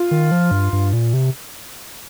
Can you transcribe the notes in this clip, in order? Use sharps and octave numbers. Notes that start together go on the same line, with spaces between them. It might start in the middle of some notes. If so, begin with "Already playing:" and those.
Already playing: F4
D#3
F3
G2
G2
A#2
C3